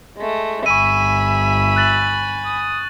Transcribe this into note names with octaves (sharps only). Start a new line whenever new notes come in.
G#3 A3
G1 E5 G#5 B5 C#6 D#7
F#6 A6 F#7
D#6